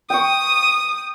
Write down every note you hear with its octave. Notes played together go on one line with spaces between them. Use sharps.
G5 C#6 D#6